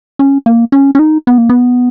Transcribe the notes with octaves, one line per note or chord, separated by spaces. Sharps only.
C#4
A#3
C#4
C#4
D#4
B3
A#3
B3